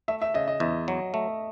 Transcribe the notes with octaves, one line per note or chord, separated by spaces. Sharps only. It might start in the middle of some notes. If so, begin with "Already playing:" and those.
A3 E5
E5
C#3 D#5
D#5
E2 E5
F#3
A3